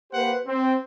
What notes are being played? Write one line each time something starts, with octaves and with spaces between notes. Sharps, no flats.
A#3 G4 B4 C5 F#5
C4